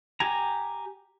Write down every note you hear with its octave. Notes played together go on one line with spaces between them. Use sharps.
G4 G#5 A#5